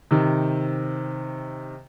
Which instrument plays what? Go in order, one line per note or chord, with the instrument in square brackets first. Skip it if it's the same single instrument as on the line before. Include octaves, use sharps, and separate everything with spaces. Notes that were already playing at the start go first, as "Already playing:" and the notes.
[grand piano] C3 D#3